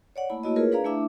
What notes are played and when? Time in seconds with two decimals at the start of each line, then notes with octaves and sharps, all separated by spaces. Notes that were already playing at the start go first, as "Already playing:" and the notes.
0.16 C#5 D5 F#5
0.30 A3 A#3 E4 B5
0.43 A3 A#3 E4 F#4 C#5 D#5
0.56 F4 G#4 A#4 B4 C#5
0.71 D4 G#4 B4 D5 F5 A#5
0.84 A3 D4 E4 E5 D6